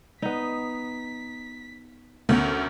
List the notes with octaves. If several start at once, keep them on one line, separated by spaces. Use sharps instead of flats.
B3 D#4 B6
D2 A3 B3 C#4 A#4